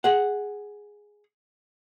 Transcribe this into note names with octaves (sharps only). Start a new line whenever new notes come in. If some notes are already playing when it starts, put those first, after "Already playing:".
G#4 F#5